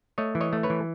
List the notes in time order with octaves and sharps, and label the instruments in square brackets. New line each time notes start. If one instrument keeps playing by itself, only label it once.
[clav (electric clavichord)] A3 C#5 D#5
E3
C#5 D#5
A3
B4 C#5
E3